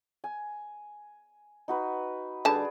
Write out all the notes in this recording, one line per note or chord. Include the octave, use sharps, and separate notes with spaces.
G#5
D#4 F#4 B4
D3 G3 G#4 B4 D5 A5